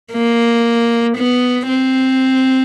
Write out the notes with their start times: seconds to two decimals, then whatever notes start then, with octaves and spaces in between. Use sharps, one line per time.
0.13 A#3
1.17 B3
1.69 C4